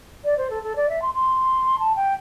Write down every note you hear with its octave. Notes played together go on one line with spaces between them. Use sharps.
D5
C5
A4
A4
D5
E5
C6
C6
A5
G5